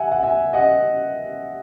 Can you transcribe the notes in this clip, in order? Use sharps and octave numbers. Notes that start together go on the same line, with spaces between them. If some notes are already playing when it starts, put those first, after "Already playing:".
Already playing: E5 F#5 G#5
F#5
E5 G#5
D#5 F#5